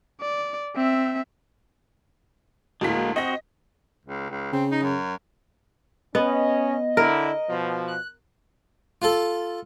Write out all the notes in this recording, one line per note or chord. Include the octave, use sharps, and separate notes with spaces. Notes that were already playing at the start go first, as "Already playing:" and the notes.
D5
C4 E5
D2 A2 G#3 A#3 B6
C4 F#4 D#5 A#6
C#2
C#2
C#3 C4
D#4
F#2
B3 C#4 D#5
D3 E4 A#4
B2 F3
F#6
F4 A4